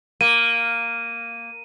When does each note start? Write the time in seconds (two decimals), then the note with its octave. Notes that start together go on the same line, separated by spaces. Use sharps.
0.21 A#3 D#7